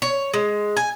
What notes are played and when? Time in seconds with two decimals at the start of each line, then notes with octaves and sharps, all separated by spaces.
0.02 C#5
0.34 G#3
0.77 G#5